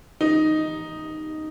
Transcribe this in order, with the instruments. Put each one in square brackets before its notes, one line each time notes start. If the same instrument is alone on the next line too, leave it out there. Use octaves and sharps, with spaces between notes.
[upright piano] D#4